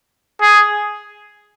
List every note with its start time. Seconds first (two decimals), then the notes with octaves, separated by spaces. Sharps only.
0.41 G#4